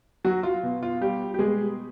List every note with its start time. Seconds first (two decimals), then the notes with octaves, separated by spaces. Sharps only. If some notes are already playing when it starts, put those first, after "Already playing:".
0.24 F#3 F#4
0.43 F4
0.63 B2
0.83 F4
1.01 G3 G4
1.34 G4
1.39 B2 G#3 G#4